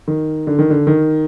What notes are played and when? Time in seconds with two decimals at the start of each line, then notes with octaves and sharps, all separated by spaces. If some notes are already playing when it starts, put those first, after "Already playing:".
0.08 D#3
0.47 D3
0.59 D#3
0.70 D3
0.87 D#3